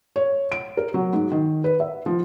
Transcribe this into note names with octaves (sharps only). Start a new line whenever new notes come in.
C#5
D7
A#4
F#3
G#2
D#3
B4
E5
F3